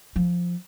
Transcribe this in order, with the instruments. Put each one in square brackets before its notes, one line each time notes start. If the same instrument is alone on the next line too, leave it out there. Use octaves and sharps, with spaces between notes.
[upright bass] F3